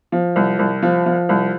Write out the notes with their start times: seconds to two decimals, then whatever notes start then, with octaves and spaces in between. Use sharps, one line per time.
0.12 F3
0.36 C2
0.59 C2
0.82 F3
1.06 F3
1.29 C2